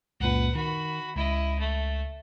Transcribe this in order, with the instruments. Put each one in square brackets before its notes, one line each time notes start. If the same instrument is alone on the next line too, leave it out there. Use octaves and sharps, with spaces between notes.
[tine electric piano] C#2 F#2 A#2 [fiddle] B4 F#5
[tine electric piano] D#3 [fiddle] F#4 B5
[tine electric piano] C#2 [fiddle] E4 D#5
[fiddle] A3